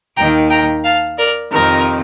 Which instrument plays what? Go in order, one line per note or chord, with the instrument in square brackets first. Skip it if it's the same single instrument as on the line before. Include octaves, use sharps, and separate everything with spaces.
[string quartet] D#2 D#3 G5 A#5
G5 A#5
F5 A5
A#4 D5
F2 C3 D#3 A#4